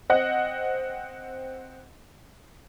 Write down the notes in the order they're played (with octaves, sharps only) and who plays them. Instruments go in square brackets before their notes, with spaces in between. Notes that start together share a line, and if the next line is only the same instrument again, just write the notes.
[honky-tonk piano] C4 D#5 F#5